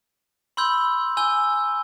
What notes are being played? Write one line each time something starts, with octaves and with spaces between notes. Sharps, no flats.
B5 C6 E6 G6
G#5 E6 G6 G7